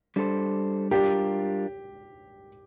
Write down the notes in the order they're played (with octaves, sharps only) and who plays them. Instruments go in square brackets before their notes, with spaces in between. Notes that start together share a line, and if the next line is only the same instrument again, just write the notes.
[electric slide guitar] G3 D4 A4 C5
[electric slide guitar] G3 D4 F4 A#4 [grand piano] G4